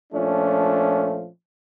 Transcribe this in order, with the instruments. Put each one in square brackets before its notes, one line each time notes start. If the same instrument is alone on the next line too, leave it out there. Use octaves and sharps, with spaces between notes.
[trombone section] A#2 F3 A3 C#4 D4